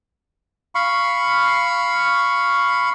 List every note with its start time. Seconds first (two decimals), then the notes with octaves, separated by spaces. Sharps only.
0.75 F5 B5 C#6